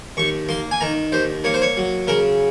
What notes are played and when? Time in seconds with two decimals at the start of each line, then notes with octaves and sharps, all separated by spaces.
0.17 D#2 C#6
0.49 A#3 C6
0.71 G#5
0.81 D#3 A#5
1.12 D#2 C5
1.44 A#3 C#5
1.54 C5
1.62 C#5
1.77 F#3
2.08 C#3 A#4